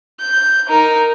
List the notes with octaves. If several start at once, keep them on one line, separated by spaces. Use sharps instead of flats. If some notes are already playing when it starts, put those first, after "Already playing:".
G6
D#4 A#4